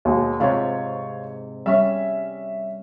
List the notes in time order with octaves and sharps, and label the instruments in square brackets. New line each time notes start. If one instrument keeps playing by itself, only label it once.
[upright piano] D#2 B2 G#3
[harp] G#2 C3 [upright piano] F4 C#5
[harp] G3 C#4 [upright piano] E5